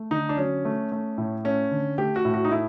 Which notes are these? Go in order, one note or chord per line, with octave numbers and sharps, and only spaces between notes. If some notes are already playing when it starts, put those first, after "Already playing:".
Already playing: A3
D3 D#4
D4
F#3 C#4
A3
A3
A2
A3 C#4
D3
A3 G4
F#4
A2
F#4
D#4
A3 E4